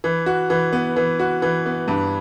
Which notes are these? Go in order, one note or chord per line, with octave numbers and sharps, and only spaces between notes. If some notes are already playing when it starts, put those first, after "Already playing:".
E3
F#4
E3
B3
E3
F#4
E3
B3
G2